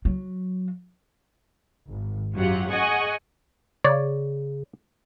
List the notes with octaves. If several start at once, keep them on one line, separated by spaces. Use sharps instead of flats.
F#3
G#1
F#2 F#3 F4 G4 F#5
G#4 D#5 F#5 G#5 C#6
C#3 C#5 D5